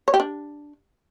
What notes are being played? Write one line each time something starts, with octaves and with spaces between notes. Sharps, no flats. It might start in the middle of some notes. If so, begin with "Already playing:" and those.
C#5
G4
D4